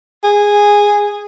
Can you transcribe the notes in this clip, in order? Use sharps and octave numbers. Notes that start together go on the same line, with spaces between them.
G#4